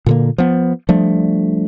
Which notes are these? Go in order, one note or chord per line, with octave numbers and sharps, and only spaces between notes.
A#2 D3 A#3
F3 B3
F3 G3 A3 D4